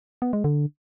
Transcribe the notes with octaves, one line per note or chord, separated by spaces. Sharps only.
B3
G#3
D3